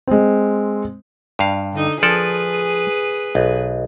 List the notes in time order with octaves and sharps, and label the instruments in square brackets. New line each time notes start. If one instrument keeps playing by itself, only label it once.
[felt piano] G#3 C4
[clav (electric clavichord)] G2 F5
[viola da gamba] D3 D#4
[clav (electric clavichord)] F3 A4 D5 [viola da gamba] G#4 B4
[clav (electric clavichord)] B1